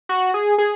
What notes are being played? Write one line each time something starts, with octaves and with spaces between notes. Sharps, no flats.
F#4
G#4
G#4